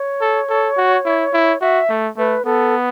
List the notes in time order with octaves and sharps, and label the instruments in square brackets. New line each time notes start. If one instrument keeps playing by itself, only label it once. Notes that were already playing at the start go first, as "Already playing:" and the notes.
Already playing: [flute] C#5
[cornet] A4
A4
F#4
E4
E4
[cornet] F#4 [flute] E5
[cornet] A3
[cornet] A3 [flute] B4
[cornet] B3 [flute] A4